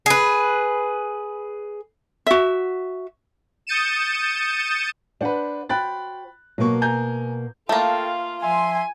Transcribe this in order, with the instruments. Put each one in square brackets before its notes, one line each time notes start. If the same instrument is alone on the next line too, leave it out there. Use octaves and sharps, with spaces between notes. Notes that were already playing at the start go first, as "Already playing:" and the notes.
[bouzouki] G#4 B4
[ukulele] F#4 E5
[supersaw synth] D#6 G6 A6 C#7 D#7 E7
[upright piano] D4 B4 [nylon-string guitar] C5 F#5
[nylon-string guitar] F#4 C5 G5 [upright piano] B5 F#6 A6
[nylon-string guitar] B2 A#3 B3 [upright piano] F#3 C#6
[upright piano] G#5 A#5 G6
[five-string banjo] A3 A#3 [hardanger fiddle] F4 [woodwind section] A4 G5 A5
[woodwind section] F3 E5 C6 [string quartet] G#5